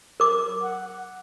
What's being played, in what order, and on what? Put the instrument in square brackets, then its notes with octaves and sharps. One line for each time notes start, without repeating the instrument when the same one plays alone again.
[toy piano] A#4 D6
[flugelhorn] F#5